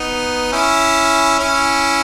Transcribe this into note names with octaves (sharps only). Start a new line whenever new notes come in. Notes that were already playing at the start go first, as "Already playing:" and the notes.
Already playing: B3 D#4
C#4 E4
C#4 E4